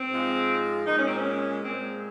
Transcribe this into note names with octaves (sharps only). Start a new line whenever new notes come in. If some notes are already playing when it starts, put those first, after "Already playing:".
Already playing: C4
G#2 F3 G#3
A#2 G#3 D#4
C#4
C4
C#4
A#2 G#3 C4